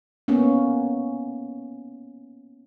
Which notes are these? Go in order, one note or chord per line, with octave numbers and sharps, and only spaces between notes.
A#3 B3 C#4